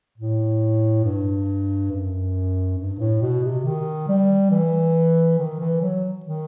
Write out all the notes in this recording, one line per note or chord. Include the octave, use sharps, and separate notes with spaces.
A2
G2
F#2
G2
A2
B2
C3
D#3
G3
E3
D#3
E3
F#3
D#3